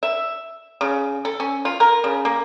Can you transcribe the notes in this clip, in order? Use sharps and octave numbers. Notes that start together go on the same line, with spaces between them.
E5
C#3
A4
C#4
F4
A#4
C#3
A#3